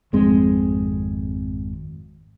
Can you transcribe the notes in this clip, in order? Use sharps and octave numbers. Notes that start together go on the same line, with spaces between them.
G#1 F2 G#3 C4